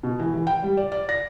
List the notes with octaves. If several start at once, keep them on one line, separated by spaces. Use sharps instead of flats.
B2
E3
E3
G5
G3
D5
D5
A#6